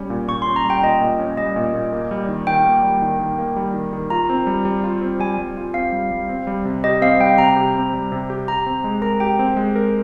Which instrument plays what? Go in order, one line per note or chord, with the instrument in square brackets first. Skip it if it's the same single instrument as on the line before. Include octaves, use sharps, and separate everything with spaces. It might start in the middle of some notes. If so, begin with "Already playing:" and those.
Already playing: [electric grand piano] G3 C#4
A#2
[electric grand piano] A#2 [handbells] C#6
[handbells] C6
[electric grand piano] C#4
[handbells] A#5
[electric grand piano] G3
[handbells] G5
[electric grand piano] A#2 [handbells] D#5
[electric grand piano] A#2
C#4
[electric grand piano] G3 [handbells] D#5
[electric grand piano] A#2
A#2
A#3
G3
D#3
[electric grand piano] D#3 [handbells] G5
[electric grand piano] A#3
G3
D#3
D#3
A#3
G3
D#3
D#3
[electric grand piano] F4 [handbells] A#5
[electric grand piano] C4
G3
G3
F4
C4
[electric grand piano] G3 [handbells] G#5
[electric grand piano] G3
F4
[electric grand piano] C4 [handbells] F5
[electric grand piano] G3
G3
C4
G3
C3
[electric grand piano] G4 [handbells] D#5
[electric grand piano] C4 [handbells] F5
[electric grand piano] G3 [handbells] G5
[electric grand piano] C3 [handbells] A#5
[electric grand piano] G4
C4
G3
C3
G4
[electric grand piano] G4 [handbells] A#5
[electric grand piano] C4
G#3
[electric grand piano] A#4 [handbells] A#5
[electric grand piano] G4 [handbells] G5
[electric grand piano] C4
G#3
A#4